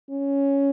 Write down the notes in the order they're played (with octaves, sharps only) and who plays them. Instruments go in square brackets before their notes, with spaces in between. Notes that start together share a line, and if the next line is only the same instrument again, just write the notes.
[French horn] C#4